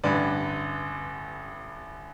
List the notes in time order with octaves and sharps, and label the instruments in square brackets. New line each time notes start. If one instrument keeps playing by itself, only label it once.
[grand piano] A1 G2 D3 B4 D5